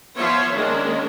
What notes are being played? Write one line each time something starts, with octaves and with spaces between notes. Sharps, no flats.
F3 B3 F4 C5 C#5 E5
D#3 G#3 A#3 C#4 D4